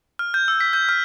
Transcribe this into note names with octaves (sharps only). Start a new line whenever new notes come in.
F6
G6
E6
B6
G6
F6